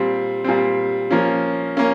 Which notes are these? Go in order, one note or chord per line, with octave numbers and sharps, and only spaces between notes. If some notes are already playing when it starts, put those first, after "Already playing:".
Already playing: A#2 G3 C4
A#2 G3 C4
F3 A#3 C#4
A#3 C#4